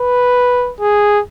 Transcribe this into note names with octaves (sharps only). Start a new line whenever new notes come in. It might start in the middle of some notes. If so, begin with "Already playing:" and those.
Already playing: B4
G#4